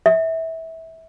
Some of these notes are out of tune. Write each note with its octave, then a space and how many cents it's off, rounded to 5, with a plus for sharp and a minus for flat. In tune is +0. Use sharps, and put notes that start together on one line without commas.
E5 -20